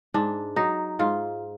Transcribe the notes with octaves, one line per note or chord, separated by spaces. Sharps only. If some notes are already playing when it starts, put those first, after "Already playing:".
G#2 D4
F#3 D#4
G#2 F4